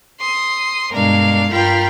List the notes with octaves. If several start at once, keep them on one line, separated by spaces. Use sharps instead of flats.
C6 D#6
G2 B2 G#3 D4 A#4 F5
G2 F4 A#4 G5 B5 F6